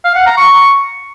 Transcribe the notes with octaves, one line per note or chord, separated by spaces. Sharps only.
F5
F#5
A#5
C#6